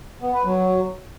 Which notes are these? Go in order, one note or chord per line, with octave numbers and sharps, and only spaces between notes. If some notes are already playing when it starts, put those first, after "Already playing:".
B3
B4
F#3